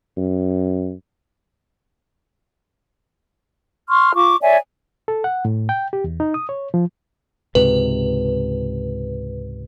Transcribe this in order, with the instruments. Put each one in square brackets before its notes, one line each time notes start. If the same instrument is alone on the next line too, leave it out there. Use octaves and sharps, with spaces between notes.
[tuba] F#2
[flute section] C6 C#6 F6
F4 C#6 D6
C#5 D5 E5 G#5
[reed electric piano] A4
F#5
A2
G5
G4
E2
D#4
D#6
C#5
F3
[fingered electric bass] C#2 G#2 C3 [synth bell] B4